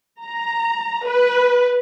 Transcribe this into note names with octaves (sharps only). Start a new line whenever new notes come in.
A#5
B4